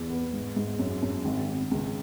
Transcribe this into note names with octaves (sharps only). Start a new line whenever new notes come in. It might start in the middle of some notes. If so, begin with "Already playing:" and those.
Already playing: E2
B3
G#2
G#2
F#2
F#2
G#1
G#1
C#2